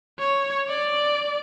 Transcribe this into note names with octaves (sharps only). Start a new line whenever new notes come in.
C#5
D5